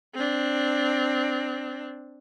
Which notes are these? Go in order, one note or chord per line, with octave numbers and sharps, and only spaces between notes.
C4 D4